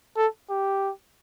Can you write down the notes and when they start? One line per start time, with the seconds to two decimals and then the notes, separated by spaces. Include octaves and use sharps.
0.17 A4
0.50 G4